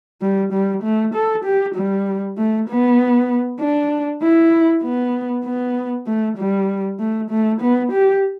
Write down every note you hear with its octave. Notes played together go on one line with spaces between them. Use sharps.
G3
G3
A3
A4
G4
G3
A3
B3
D4
E4
B3
B3
A3
G3
A3
A3
B3
G4